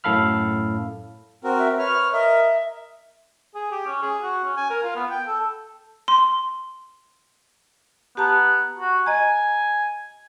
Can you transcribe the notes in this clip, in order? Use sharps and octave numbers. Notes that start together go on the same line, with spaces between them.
F#2 A2 A4 F5 B5 F6
C4 F#4 A#4
E5
B4 C#5 F6
A#4 D#5 E5
G#4
G4
C#4
G#4
F#4
C#4
G#5
A#4
F4
B3
G5
A4
C6
B3 G4 A5 A#5
F#4
D#5 G#5 A#5